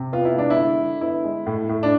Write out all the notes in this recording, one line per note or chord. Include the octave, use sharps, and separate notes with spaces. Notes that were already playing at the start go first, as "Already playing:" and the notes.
Already playing: C3
B3 F4
E4
G#3 D4
E4
D3
D3
B3 E4
G#3
A2
A2
D4